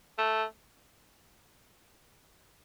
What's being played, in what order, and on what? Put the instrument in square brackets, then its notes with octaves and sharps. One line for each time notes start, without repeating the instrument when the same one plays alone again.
[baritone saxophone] A3